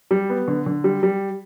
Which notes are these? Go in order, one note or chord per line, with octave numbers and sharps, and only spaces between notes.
G3
B3
D3
D3
G3
G3